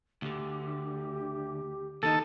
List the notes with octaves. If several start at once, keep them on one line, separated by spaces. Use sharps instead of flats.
D2 D3 G4
D#2 D#3 D#4 A4